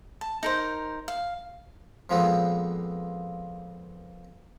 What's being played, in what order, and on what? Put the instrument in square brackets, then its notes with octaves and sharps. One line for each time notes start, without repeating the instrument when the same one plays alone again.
[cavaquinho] A5
D#4 A#4 C5
F5
[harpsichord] F2 A#2 F3 G#3 B3 C4